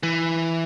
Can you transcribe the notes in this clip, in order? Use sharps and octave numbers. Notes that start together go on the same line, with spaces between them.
E3